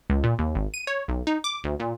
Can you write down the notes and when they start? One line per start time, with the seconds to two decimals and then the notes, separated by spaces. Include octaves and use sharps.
0.10 C#2
0.24 A#2
0.39 D#2
0.55 G#1
0.74 D#7
0.87 C#5
1.08 B1
1.27 D#4
1.44 D6
1.64 D2
1.80 A#2